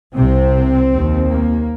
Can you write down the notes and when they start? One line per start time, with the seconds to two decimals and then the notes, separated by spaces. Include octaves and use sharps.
0.16 C2 C3 C4
0.93 D#2
1.31 A#3